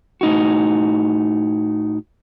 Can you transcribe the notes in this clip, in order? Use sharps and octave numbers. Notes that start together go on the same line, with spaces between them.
A2 D#4 F#4